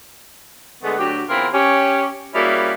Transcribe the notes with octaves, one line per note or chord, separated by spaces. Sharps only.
D3 G#3 A3 B3
D2 F#3 D4 G4
E2 C4 E4 F4 A#4
C#4 G4
G3 A#3 C#4 E4 F#4 G#4